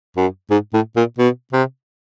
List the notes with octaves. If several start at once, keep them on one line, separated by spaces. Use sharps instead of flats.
F#2
G#2
A2
A#2
B2
C3